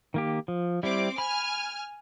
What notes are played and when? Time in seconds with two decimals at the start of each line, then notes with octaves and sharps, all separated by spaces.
0.14 D#3 A#3 G4
0.48 F3
0.83 G3 C4 E4 D6
1.18 G#5 B5 F6